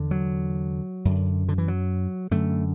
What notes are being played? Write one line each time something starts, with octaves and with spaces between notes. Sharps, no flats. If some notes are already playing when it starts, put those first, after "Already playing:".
Already playing: E2 D3
F#3
F#2 D3
D3
E3
F#3
F#2 D3 A3